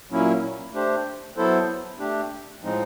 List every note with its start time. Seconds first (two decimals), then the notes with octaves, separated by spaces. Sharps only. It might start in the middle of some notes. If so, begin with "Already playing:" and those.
0.11 A#2 F#3 A#3 C#4 E4
0.73 A3 D4 G4 C5
1.37 F#3 B3 E4 A4 C5
1.99 A3 D4 G4
2.62 A2 F3 G#3 C4 D#4